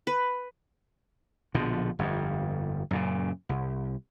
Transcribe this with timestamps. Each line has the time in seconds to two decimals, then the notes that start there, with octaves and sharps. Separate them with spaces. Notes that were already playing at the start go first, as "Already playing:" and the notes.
0.07 B4
1.54 A#1 B2 D3 F3
1.99 G1 F2
2.91 F#2 A#2 C#3
3.49 C2